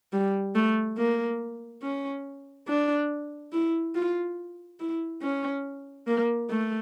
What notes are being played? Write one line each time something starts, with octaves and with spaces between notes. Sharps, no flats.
G3
A3
A#3
C#4
D4
E4
F4
E4
C#4
A#3
A3